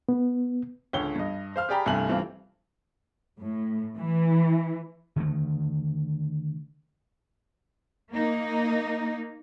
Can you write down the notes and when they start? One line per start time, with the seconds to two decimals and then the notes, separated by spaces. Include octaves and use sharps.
0.09 B3
0.93 C#2 D3 C#5 G7
1.16 G2 D#5
1.56 C5 F5 F6
1.69 G4 G#4 D5 G5 A#5 B5
1.86 C2 G2 C3 A3 G#5 F#7
2.09 G2 E3 C4 F4
3.43 A2
3.98 E3
5.16 D3 D#3 A3
8.11 A#3 D#4